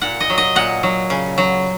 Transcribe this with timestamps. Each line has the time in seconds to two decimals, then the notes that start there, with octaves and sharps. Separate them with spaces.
0.02 A#2 F#5
0.20 D#5
0.30 F#3
0.38 D#5
0.55 A#2 F#5
0.83 F#3
1.10 C#3
1.38 F#3